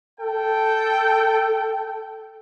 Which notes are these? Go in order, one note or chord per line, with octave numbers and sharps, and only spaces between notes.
A4 G5